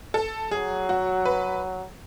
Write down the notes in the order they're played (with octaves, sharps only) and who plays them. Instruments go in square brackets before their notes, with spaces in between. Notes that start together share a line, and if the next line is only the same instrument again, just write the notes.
[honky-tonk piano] A4
[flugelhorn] F#3 [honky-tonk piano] G#4
[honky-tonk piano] F#4
B4